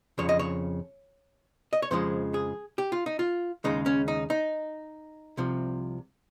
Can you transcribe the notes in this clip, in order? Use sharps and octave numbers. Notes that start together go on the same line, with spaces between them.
F2 C#3 F3 C#5
D#5
C#5
D#5
C#5
F2 C#3 F3 G#3 C5
G#4
G4
F4
D#4
F4
D#2 C#3 G#3 D#4
C#4
D#4
D#4
C2 C3 F3